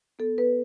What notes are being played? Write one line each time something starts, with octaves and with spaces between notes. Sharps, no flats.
B3 A4
B3 B4